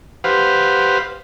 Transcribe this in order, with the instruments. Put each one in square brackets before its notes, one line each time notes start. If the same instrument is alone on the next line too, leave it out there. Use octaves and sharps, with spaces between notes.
[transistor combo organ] G4 B4 C5 F5 F#5